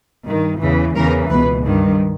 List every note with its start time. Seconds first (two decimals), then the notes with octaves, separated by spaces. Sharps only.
0.26 G2 D#3
0.60 E2 C#3 E3
0.95 E2 C#3 E3 A#4
1.30 C#2 B2 B4
1.65 G2 D#3